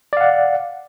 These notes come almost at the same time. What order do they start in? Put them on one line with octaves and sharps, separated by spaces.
D5 F5 F#5